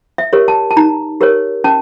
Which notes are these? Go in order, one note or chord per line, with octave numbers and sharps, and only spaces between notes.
E5
G4 A#4 C#5
A5
A5
D#4 A#5
G4 A#4 C#5
C#4 A5